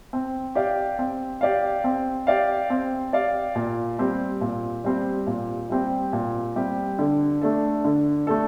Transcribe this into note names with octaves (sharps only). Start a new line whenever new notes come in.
C4
G4 D5 F5
C4
G4 D5 F5
C4
G4 D5 F5
C4
G4 D5 F5
A#2
G3 C4 G4
A#2
G3 C4 G4
A#2
G3 C4 G4
A#2
G3 C4 G4
D3
A3 D4 A4
D3
A3 D4 A4